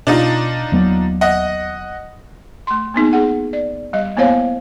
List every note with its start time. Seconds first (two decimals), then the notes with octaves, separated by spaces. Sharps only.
0.07 B2 D4 D#4 F4
0.72 D#2 F#3 B3
1.21 D#5 F#5
2.67 A3 C6
2.94 A#3 B3 D#4 G#4
3.13 G#4 F#5
3.53 D5
3.93 G3 D#5
4.17 A#3 B3 E4 C5 C#5 F5